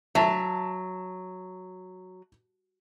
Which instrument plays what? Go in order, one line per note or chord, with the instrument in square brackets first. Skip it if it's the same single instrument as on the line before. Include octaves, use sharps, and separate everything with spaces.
[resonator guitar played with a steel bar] F#3 [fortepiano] E5 A5